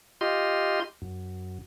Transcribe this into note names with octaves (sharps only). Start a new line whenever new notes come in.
F4 G4 D#5 C6
F#2